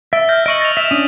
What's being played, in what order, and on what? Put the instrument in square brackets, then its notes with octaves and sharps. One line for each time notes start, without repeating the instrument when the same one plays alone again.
[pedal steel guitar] E5 [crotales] E6 A6 D7
[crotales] F6 G6 A#6
[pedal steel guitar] D#5 C#6 [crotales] D7 D#7 F#7
[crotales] A6 F7
[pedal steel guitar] E5 [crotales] B6 E7
[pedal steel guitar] C#4 D4 [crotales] D#6 D#7